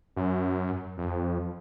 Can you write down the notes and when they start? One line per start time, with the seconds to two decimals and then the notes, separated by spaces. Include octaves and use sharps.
0.16 F#2
0.98 F2